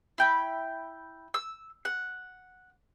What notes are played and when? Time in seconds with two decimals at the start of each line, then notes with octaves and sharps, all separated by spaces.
0.18 E4 G5 B5
1.34 E6
1.85 F#5